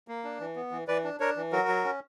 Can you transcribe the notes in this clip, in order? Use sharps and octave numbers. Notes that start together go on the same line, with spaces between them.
A#3
D4
E3
B3
E3
E3 B4 D5
D4
D4 A#4 C#5
E3
F#3 F#4 A#4
F#3
C#4